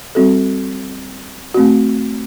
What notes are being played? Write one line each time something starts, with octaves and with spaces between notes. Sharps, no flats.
G3 C4 F#4 A4
A3 C4 F#4